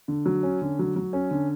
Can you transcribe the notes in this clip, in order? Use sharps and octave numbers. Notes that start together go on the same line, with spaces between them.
D3
F#3
C#4
D3
F#3
F#3
C#4
D3